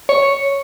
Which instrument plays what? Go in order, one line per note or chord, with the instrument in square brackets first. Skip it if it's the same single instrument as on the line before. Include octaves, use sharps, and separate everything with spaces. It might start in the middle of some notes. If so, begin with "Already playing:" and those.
[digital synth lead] C#5